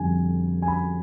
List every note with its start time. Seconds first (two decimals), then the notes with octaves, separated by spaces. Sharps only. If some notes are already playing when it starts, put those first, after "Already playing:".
Already playing: F2 D3 G3 G#5
0.62 G#5
0.68 B5